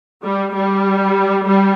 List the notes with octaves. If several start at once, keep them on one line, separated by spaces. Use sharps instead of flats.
G3
G3
G3